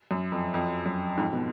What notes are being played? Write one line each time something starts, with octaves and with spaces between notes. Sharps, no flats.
F#2
F2
F2
F#2
F2 G#2
B2